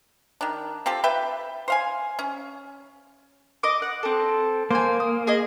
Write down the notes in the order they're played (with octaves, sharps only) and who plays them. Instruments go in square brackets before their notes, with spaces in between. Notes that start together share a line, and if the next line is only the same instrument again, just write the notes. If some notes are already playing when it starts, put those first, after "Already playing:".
[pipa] D#3 D4
C4 F4 G4 A4
B4 E5 G5
C5 F5 G#5
C#4
[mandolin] D#5 D6
F#5
C4 A4
[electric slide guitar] A#3 [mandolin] C5 G#5
[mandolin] D#6
G#4 D#5